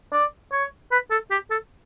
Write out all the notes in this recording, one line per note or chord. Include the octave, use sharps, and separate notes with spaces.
D5
C#5
B4
A4
G4
A4